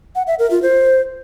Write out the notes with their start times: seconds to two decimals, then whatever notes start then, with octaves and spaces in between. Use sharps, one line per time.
0.15 F#5
0.27 E5
0.39 A#4
0.51 F4
0.62 C5